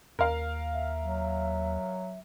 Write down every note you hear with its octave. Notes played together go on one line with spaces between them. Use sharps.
D#2 A#4 F5
E5
F#3